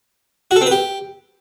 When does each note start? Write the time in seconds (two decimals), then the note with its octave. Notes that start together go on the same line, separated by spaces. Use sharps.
0.51 F#4
0.56 A4
0.61 C4
0.66 B4
0.71 G4